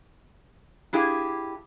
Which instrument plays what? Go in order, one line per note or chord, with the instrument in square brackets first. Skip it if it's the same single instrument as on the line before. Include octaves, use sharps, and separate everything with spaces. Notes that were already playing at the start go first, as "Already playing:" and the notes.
[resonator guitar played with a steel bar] D4 E4 G4 G#4 F5